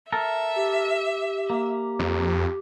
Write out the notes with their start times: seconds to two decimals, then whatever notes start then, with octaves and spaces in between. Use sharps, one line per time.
0.12 A4 A#4 E5
0.56 G4
1.50 A#3
1.99 F2